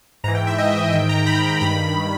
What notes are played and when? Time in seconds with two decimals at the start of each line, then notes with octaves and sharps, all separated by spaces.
0.24 G#2 A#5
0.28 E3
0.35 G5
0.47 E5
0.58 D#5
0.81 E5
0.92 G#2 D#3 G5
1.09 A#5
1.26 B5
1.38 B5
1.61 G2 D#3 B5